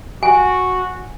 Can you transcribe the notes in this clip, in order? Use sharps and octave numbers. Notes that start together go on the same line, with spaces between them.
F#4 G#5